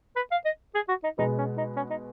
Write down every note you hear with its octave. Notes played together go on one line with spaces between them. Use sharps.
B4
F5
D#5
G#4
F#4
D#4
B2 G#3 B3 D#4
C#4
D#4
C#4
D#4